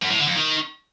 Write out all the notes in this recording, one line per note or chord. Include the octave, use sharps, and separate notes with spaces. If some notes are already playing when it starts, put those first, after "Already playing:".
F#2
A2
D3
F2
D#3